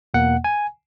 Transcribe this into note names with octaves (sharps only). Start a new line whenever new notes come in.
E2 B2 A#3 F#5
G#5